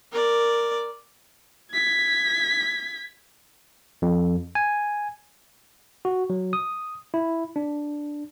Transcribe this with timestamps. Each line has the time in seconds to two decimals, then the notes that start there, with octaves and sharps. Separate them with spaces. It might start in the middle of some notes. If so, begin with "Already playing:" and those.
0.12 A#4 D5
1.73 G#6 B6
4.02 F2
4.55 G#5
6.05 F#4
6.30 F#3
6.53 D#6
7.14 E4
7.56 D4